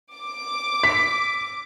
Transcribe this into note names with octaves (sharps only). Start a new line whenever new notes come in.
D6
B6